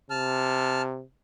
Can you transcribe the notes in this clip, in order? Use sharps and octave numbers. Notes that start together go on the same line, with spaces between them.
C3 A5 F6